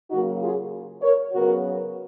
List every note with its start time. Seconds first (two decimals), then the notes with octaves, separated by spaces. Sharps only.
0.11 C#3 F#3 A#3 D#4 F#4
0.41 F4 G#4
1.02 A#4 C#5
1.33 C#3 F#3 B3 F#4 A#4